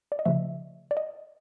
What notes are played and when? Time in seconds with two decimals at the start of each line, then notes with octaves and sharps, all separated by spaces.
0.12 D5
0.19 D#5
0.25 C#3 F3 A3 E5
0.91 D5
0.97 D#5